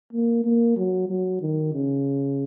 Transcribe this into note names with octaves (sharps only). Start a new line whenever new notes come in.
A#3
A#3
F#3
F#3
D#3
C#3